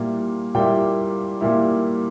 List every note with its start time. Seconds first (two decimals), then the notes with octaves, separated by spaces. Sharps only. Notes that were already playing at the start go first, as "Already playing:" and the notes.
Already playing: A#2 G3 A#3 E4
0.54 A#2 G3 A#3 E4 G5
1.41 A#2 G3 A#3 E4